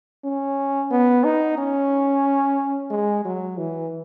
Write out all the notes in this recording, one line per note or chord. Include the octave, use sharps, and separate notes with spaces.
C#4
B3
D#4
C#4
G#3
F#3
E3